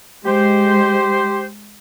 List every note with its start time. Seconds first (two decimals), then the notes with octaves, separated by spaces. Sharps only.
0.25 G#3 G4 C5